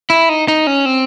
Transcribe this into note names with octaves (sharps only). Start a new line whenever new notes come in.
E4
D#4
D#4
C#4
C4